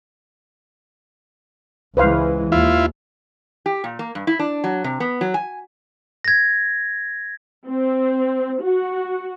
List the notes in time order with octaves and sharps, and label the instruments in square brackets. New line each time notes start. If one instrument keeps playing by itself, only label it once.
[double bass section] C#2 E3 G#3 [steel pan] B4 C5 F5
[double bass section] D#2 [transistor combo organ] E4 F4
[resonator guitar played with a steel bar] G4
A#2
A#3
G2
E4
D4
F#3
C3
B3
F#3
G#5
[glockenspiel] G#6 A#6
[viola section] C4
F#4